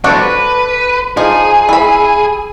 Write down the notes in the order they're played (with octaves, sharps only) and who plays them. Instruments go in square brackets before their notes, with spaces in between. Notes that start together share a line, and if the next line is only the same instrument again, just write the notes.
[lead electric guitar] G3 C4 [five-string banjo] D4 F#4 A4
[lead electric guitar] B4
[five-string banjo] F3 D#4 [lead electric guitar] G#4
[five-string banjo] E4 B5